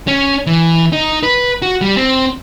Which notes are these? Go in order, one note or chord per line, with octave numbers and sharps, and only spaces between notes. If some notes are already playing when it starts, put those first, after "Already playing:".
C#4
E3
D#4
B4
F#4
G3
C4